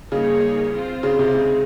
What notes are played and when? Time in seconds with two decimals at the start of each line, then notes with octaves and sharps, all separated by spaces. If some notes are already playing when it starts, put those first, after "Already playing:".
0.12 C#3 G3 A#3 D#4 G#4 C#5
0.73 C4 F4 C5
1.03 C#3
1.19 C3
1.34 C#3 G#3 C4 D#4